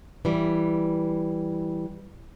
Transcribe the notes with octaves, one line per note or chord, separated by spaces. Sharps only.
E3 G3